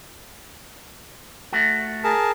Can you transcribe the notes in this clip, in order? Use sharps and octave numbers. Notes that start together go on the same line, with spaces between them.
A3 F#4
G#4 A#4 A5